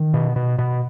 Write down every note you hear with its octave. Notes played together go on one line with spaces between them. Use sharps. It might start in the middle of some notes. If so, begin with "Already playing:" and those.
Already playing: D#3
B2
B2
B2